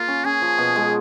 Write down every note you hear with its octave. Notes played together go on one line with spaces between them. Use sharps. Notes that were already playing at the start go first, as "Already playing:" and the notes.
Already playing: A#3 F4
C#4
C#4 G#4
F3
B2
G#3